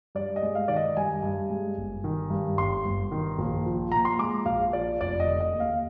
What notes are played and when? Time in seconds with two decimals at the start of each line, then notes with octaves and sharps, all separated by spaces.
0.15 G2 D5
0.36 D#5
0.42 G#3
0.55 F5
0.68 D#3 D5
0.76 D#5
0.97 G2 G#5
1.23 G2
1.50 G#3
1.78 G1
2.04 D#3
2.30 G2
2.58 G1 C6
2.85 G1
3.12 D#3
3.39 A#1
3.66 F3
3.92 A#2 A#5
4.05 C6
4.19 G#3 D6
4.46 A#1 F5
4.73 F3 D5
5.01 F1 D5
5.20 D#5
5.27 D3
5.40 D#5
5.54 D#2
5.60 F5